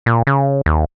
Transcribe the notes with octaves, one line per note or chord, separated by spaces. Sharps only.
A#2
C#3
D#2